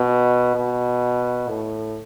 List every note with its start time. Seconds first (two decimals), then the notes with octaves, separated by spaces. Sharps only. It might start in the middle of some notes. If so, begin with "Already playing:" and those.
Already playing: B2
0.55 B2
1.48 A2